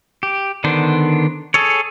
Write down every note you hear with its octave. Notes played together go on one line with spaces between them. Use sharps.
G4
D3 D#3 B3 D4 C5
G#4 A4 C#5